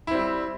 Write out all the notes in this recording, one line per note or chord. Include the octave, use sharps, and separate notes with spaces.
G3 C4 E4